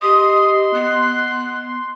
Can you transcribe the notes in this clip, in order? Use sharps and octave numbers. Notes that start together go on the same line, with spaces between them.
G4 D#5 C6 D#6
B3 F#6